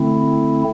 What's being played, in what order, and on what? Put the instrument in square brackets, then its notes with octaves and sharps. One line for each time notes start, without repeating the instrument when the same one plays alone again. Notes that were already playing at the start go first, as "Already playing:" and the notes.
Already playing: [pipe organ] D3 A3 C4 E4